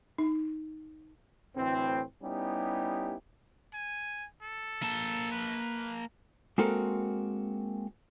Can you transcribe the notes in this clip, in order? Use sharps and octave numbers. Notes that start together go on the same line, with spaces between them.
D#4
D2 A2 E3 C4
G3 B3 C#4 D#4 E4 G4
G#5
A4
A#3 A5
B4
G#3 A#3 C4 F#4 A4 A#4